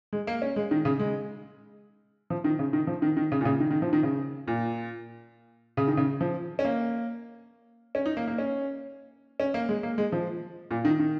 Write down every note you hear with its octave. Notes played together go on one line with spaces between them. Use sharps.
G#3
A#3
C#4
G#3
D#3
C#3
G#3
F3
D#3
C#3
D#3
F3
D#3
D#3
C#3
A#2
C#3
D#3
D#3
F3
D#3
C#3
A#2
C#3
D#3
C#3
F3
C#4
A#3
C#4
D#4
A#3
A#3
C#4
C#4
A#3
G#3
A#3
G#3
F3
A#2
D#3
D#3